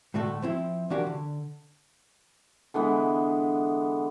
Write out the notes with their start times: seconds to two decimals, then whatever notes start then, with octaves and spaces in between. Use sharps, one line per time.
0.14 A2 D3 A3 F#4 A4
0.42 F3 C4 E4
0.90 E3 F3 D4 F#4 G4 A#4
1.07 D3
2.74 D3 E3 G#3 B3